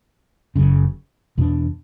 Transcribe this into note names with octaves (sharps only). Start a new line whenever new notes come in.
F#1 F#2 C#3
E2 B2 A3 D4